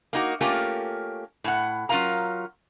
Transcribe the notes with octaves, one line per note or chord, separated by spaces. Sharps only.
A#3 D#4 F#4
A3 A#3 C#4 F4 G4
A2 F#5
F#3 C#4 F4 A#4 F5 A#5